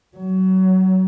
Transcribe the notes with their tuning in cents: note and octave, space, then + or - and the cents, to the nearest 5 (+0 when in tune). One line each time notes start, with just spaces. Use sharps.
F#3 +25